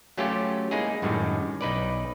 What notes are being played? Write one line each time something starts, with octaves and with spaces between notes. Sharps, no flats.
F#3 A3 C#4 F4 G4
G#3 A#3 D#4 E4 G#4
F#2 A2 D3 D#3 G3 G#3
B1 D#4 B4 D5